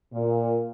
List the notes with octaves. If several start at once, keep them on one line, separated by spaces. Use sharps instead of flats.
A#2